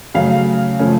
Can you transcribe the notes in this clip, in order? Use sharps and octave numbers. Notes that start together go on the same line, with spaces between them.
C#3 F#3 A3 C#4 F5
C#3 F3 A3 C#4